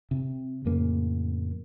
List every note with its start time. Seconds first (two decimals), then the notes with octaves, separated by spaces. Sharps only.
0.11 C3
0.65 F2 A2 C#3 A#3